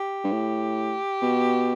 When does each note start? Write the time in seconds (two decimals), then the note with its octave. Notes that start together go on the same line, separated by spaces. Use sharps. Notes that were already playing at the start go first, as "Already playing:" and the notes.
Already playing: G4
0.24 G2
0.32 A2
1.22 B2